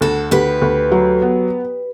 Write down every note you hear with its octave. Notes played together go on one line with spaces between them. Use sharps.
D2 F#4 A4
D2 G4 B4
D2
F#3
B3